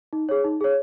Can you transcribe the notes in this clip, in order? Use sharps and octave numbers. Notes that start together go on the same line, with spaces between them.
D#4
G#4 C#5
D#4
G#4 C#5